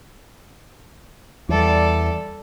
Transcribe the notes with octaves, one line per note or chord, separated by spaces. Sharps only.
E2 G3 A4 D5